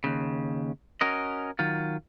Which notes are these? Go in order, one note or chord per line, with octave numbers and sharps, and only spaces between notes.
D#2 C#3
C#4 F#4 A#4 D#5
D#3 F#3 F4